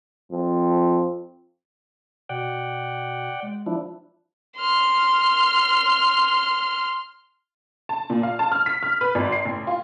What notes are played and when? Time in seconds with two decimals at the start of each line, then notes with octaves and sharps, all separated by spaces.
0.32 F2
2.29 B2 D5 F#5 G5
3.42 G#3
3.66 F3 D4 E4
4.59 C6 F6
7.89 A5
8.10 A#2
8.23 F5
8.39 A5
8.52 F6
8.66 B6
8.83 F6
9.01 B4
9.15 G#1
9.32 C7
9.45 A1
9.67 F4